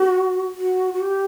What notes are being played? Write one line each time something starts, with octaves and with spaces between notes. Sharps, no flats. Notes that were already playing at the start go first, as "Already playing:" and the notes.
Already playing: F#4
F#4
F#4
G4